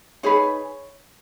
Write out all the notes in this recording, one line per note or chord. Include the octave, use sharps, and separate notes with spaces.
D#4 G#4 B4 C#5